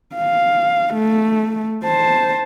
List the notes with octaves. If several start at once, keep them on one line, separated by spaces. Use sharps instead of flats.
F5
A3
C5 A5